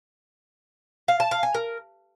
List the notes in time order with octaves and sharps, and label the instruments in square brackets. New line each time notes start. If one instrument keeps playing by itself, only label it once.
[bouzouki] F5
A5
F5
G#5
A#4